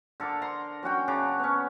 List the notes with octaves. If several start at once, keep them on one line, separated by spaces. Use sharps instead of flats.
D3 A4 A#4 D6
A#5 C6
F#3 C#4 F#4 G5
C#3 D4 A#5 D6
B3 C#4